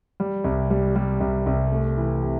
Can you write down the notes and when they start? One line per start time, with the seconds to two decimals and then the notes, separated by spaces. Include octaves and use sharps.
0.20 G3
0.44 C2
0.70 G3
0.96 G3
1.21 C2
1.46 C2
1.72 A3
1.97 E3
2.23 C3